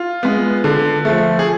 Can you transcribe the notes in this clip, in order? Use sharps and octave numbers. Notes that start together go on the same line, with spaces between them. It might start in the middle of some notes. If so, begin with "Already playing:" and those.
Already playing: F4
G#3 B3
D3
F3 A3
G#4